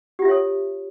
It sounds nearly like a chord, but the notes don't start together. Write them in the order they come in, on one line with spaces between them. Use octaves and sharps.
G4 F4 E5 C#5 A4